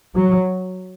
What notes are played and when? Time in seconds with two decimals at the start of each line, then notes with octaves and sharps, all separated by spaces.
0.15 F#3